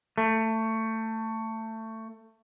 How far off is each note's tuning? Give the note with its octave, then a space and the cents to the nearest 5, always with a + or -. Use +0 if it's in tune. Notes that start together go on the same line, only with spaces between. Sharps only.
A3 +20